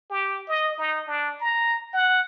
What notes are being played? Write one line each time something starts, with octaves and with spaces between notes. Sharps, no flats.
G4
D#5
D#4
D4
A#5
F#5